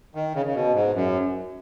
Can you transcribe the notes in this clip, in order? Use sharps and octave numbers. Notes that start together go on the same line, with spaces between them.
D#3
C#3
C#3
B2
G#2
F#2